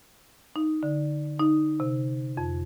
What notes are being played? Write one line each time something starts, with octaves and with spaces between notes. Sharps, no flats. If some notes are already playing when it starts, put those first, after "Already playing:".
D#4
D3
D#4
C3
F2